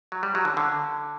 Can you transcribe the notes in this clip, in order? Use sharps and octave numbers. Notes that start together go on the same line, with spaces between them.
F#3
G3
F#3
D3
D3